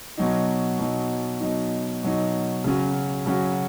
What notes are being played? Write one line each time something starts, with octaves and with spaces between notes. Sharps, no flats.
B2 F#3 D#4
B2 F#3 D#4
B2 F#3 D#4
B2 F#3 D#4
C#3 F#3 C#4 F#4
C#3 F#3 C#4 F#4